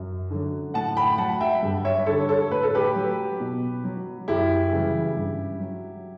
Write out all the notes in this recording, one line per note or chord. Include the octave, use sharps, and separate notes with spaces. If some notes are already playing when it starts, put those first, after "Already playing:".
Already playing: F#2
D3 F#3
A2 F#5 A5
G5 B5
F#3 F#5 A5
E5 G5
G2
C#5 E5
D3 G3 A4 C#5
A4 C#5
A2 B4
A4
G4 B4
F#3
B2
F#3
F#2 E4 G4
C#3 E3 G3
G2
F#3